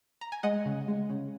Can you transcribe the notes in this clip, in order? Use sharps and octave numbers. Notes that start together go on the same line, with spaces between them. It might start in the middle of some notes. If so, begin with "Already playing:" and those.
A#5
G#5
G#3 D#5 F#5
C#3
G#3
C#3